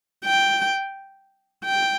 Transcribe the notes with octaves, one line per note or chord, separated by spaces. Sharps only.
G5
G5